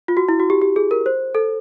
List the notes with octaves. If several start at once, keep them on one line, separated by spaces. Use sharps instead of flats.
F4
F#4
E4
F#4
G4
G4
G#4
A#4
C5
A4